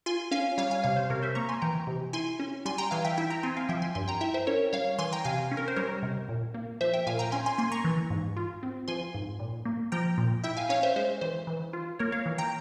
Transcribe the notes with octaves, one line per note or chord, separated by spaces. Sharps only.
F4 G#5 C6
C#4 F5 G#5
G3 C#5 F5
F5 G#5
C3 C#5 F5
C5
C3 A#4 C#5
C5 E5
A#3 A#5 C#6
G#5 C6
E3 G5 A#5
C3
E4 G#5 C6
C#4
G3 G#5 C6
G5 A#5
E3 F5 G#5
E5 G5
E4 E5 G5
G5 A#5
C4 G#5 C6
F5 G#5
F3 E5 G5
G#5 C6
G2 G#5 C6
G5 A#5
E4 E5 G5
C5 E5
C#4 A#4 C#5
G3 C#5 F5
E3 G#5 C6
G5 A#5
C3 F5 G#5
C#4
A#4
C5
G3 A#4 C#5
C3
A#2
A#3
F3 C5 E5
E5 G5
A#2 F5 G#5
G5 A#5
C#4 G#5 C6
G#5 C6
A#3 G#5 C6
A#5 C#6
E3
G#2
F4
C4
F3 G#5 C6
G#2
A#2
A#3
F3 G5 A#5
A#2
E4 E5 G5
F5 G#5
C#4 C#5 F5
C5 E5
G#3 C5
E3 C5
E3
F4
A#3 A#4 C#5
C#5 F5
E3
G5 A#5